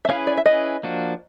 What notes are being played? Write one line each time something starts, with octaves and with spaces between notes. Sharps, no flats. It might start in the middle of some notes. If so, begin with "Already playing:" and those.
E5
C#4 E4 G#4 B4 F5
D5
E5
C#4 E4 G#4 B4 D#5
F3 A#3 D4 F#4